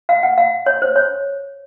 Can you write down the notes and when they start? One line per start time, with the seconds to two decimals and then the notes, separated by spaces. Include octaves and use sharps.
0.09 F5
0.23 F#5
0.38 F5
0.66 C#5
0.82 C5
0.96 C#5